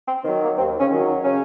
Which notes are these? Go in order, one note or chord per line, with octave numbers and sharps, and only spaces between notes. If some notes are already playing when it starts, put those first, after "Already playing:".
C4
D#3 F#3 C4
A#3
D#2 C4
C#3 C#4
D#3 F#3
D#3 D#4
C#3 C#4